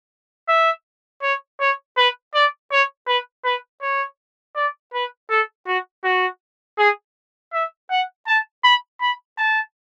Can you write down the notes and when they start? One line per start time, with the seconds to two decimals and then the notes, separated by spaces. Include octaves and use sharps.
0.49 E5
1.22 C#5
1.60 C#5
1.97 B4
2.34 D5
2.71 C#5
3.07 B4
3.45 B4
3.81 C#5
4.56 D5
4.94 B4
5.30 A4
5.67 F#4
6.04 F#4
6.78 G#4
7.53 E5
7.90 F#5
8.27 A5
8.64 B5
9.01 B5
9.38 A5